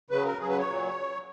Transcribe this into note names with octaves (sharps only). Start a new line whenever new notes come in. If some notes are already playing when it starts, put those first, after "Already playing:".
C#3 F#3 B4
A#4
C#3 F#3 G#4
B4
C#5
A#2 F#3